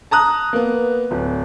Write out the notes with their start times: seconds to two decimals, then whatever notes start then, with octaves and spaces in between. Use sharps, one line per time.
0.11 A5 A#5 D#6 F#6
0.53 A#3 B3
1.11 D1